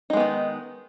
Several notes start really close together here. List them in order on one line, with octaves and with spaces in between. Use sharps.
D#4 G#3 B3 D#3